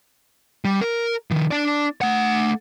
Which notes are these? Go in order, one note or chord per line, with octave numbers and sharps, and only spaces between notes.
G3
A#4
D#3 F3
D4 D5
A3 F#5